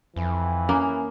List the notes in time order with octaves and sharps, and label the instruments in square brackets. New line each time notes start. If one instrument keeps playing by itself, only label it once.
[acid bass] F2 [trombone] E3
[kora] A#3 [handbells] C#4